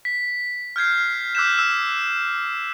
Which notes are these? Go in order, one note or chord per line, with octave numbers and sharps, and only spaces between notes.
B6
F6 G6 G#6 C7
D6 E6 F#6 G6 B6 E7
E6 E7